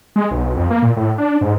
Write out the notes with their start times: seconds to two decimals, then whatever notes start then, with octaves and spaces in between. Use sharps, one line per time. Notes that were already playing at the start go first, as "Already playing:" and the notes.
0.16 G#3
0.31 B1
0.57 F2
0.70 A#3
0.82 A#2
0.96 A2
1.18 D4
1.41 G#2